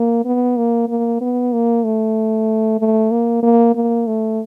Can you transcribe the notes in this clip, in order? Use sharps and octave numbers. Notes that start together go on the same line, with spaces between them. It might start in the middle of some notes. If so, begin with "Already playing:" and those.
Already playing: A#3
B3
A#3
A#3
B3
A#3
A3
A3
A#3
A#3
A#3
A3